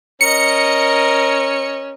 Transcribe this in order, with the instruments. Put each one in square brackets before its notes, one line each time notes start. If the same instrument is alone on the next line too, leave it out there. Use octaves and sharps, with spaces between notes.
[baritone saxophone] C#4 [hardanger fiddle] A#4 D#5 [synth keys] C#7